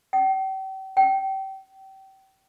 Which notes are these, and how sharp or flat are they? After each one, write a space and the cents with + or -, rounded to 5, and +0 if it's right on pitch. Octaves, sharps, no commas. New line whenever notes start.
G5 -40
G5 -30